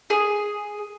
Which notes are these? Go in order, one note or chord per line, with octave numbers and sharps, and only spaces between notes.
G#4